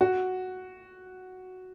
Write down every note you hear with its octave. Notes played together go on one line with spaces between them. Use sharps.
F#4